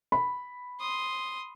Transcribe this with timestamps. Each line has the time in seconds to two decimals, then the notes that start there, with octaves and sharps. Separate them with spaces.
0.12 B5
0.80 C6 D#6